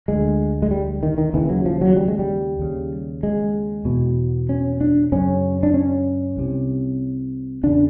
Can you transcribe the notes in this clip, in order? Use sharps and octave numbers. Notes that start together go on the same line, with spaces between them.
D2 D3 G#3
G#3
G3
D#3
D#3
D#2 C#3 E3
F#3
F3
F#3
G3
G#3
G3
D#2 C#3
G#3
E2 B2
C#4
D4
F#2 C#3 C#4
D4
C#4
C2 C3
E2 C#3 D4